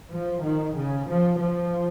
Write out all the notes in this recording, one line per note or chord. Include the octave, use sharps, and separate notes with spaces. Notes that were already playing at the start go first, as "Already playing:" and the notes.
F3
D#3
C#3
F3
F3